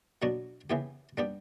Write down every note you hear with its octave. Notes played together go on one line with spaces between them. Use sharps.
B2 F#3 B3 D4 F#4
C#3 E3 B3 E4 G4
G3 B3 D4 G4